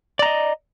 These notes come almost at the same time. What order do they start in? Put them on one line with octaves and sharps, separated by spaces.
D5 A#5 D#5